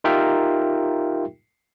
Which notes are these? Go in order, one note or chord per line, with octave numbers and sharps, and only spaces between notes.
D#4 F4 G4 A#4 E5 G5